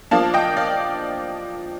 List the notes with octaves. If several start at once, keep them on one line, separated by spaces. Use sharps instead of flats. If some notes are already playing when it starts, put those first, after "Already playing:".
F3 A#3 D4 F5 A5
D#5 G5
D5 F5